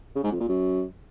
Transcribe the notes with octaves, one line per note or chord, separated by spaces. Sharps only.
C#3
G#2
F2
A#2
F#2